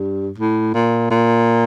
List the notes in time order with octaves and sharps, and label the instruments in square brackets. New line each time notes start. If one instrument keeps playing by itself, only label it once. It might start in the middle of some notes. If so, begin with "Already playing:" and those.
Already playing: [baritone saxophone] G2
A2
A#2
A#2